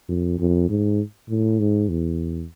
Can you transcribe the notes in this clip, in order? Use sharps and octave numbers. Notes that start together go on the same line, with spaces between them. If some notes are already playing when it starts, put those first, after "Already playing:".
F2
F2
G#2
A2
G#2
E2